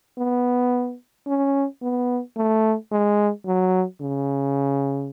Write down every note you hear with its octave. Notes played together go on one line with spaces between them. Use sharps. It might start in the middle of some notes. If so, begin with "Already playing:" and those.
B3
C#4
B3
A3
G#3
F#3
C#3